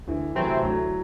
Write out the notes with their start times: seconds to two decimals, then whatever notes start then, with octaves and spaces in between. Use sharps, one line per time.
0.08 D2 E3
0.35 C3 E3 F#3 A3 C4
0.63 D2 F#3